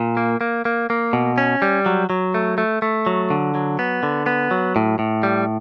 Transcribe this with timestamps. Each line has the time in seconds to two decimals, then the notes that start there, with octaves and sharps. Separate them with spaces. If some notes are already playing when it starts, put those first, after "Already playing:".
Already playing: A#2
0.17 A#3
0.41 A#3
0.65 A#3
0.90 A#3
1.13 B2
1.38 C#4
1.62 G3
1.86 F#3
2.10 F#3
2.34 A3
2.58 A3
2.82 A3
3.06 F#3
3.30 D3
3.55 F#3
3.79 B3
4.03 D3
4.26 B3
4.51 F#3
4.76 A2
4.99 A2
5.23 G3